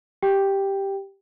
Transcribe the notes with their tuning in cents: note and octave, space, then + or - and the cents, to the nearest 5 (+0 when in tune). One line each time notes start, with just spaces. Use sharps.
G4 +0 G5 +5